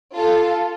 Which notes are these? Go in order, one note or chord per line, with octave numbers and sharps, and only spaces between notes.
F4 A4